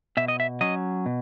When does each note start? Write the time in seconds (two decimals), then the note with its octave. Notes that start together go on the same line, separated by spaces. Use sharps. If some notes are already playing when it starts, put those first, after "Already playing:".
0.17 B2 E5
0.28 D#5
0.40 E5
0.61 F#3 C#4 D#5
1.06 B2